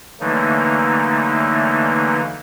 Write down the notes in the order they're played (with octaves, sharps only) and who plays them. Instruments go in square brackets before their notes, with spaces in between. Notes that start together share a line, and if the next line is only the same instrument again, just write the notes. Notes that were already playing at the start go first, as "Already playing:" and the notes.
[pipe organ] D3 E3 F#3 A3 A#3 D#4